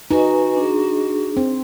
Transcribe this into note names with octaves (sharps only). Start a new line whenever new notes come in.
D#4 F#4 B4 G#5
D4 G#4
C4